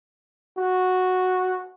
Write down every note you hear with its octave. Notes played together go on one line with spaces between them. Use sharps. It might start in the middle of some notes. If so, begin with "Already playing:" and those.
F#4